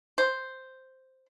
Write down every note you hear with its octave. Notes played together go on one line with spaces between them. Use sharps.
C5